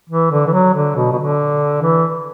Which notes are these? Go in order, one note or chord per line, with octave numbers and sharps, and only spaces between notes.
E3
D3
E3
F#3
D3
B2
B2
D3
E3